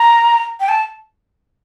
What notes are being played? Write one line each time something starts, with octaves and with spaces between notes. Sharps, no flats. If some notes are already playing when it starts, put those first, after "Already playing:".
Already playing: A#5
G5
A5